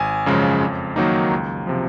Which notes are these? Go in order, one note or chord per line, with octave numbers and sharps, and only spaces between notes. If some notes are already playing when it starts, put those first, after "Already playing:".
Already playing: G#1 G#5
F#2 C#3 F3 G#3
F2
D#3 F#3 A#3 D#4
C#2
C3 F3